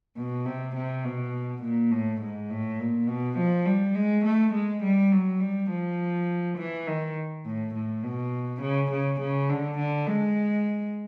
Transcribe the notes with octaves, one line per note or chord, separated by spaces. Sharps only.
B2
C3
C3
B2
A#2
A2
G#2
A2
A#2
B2
F3
G3
G#3
A3
G#3
G3
F#3
G3
F3
E3
D#3
A2
A2
B2
C#3
C#3
C#3
D3
D3
G#3